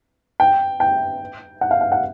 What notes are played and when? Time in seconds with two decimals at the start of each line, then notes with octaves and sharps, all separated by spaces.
0.40 G5
0.80 G5
1.61 F#5
1.71 F5
1.81 F5
1.92 F#5